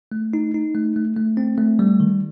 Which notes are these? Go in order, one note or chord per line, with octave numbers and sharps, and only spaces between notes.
A3
D#4
D#4
A3
A3
A3
C4
A3
G3
D#3